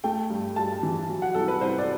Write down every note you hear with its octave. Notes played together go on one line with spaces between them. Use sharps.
A3 G5
G2
G2 A5
E3
F#3
F#5
C2 A4
B4
C2 C5
D5